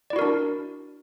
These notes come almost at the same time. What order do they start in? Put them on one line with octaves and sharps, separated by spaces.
D5 E4 F#4 A#4 D4